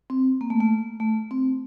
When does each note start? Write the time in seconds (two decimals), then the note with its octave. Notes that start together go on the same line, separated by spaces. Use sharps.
0.10 C4
0.41 A#3
0.50 A3
0.60 A3
1.00 A3
1.31 C4